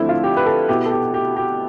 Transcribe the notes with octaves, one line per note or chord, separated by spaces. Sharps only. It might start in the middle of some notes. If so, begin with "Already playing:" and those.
Already playing: D3 F3 A3 C4 E4
F4
G4
B4
A4
B2 B3 E4 G4
A4
G4
G4
G4